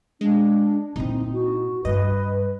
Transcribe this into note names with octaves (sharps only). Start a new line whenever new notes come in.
G#3 D4
A#2 C4 D#4 E4
F#4
G2 B4 D#5